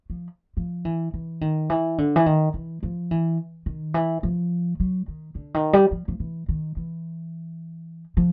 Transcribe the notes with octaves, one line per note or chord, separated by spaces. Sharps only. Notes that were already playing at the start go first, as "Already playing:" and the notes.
F3
F3
E3
E3
D#3
E3
D3
E3
D#3
E3
F3
E3
D#3
E3
F3
F#3
D#3
D3
D#3
G3
F3
F3
E3
D#3
E3
F3